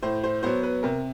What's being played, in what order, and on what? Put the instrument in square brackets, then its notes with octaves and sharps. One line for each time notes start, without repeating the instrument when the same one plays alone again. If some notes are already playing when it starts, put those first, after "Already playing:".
[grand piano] A2 C5
C5
F#3 B3 C5
B4
C3 A#4